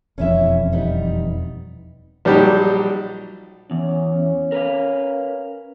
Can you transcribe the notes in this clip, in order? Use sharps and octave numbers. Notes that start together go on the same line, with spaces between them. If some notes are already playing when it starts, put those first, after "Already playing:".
E1 F2 C#4 E4 E5
G3 B3 D#4
A#1 F#3 G3 D#4 G4
E2 C#4
A#4 B4 F5